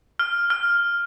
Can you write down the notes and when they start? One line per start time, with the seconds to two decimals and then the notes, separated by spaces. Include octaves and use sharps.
0.19 F6
0.50 F6